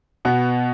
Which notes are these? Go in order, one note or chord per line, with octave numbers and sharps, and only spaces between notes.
B2 B3